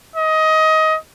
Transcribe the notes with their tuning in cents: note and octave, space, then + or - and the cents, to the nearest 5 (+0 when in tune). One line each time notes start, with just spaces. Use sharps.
D#5 +20